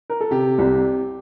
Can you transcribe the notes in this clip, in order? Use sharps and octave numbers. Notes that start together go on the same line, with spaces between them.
A#4
A4
C3 G4
C2